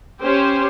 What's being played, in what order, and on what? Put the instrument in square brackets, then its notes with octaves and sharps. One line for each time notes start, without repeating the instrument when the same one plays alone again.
[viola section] C#4 G4 C5